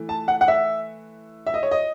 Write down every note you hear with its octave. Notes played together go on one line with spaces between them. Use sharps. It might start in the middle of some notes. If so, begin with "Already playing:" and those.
Already playing: E3 A3
A5
F#5
F#5
E5
E5
D#5
C#5
D#5